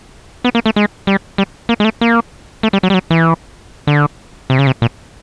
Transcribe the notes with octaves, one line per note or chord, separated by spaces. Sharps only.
B3
A#3
A3
G#3
G3
G3
A#3
G#3
A3
A#3
A3
G3
F#3
G3
F#3
E3
D3
C3
C#3
C3
A#2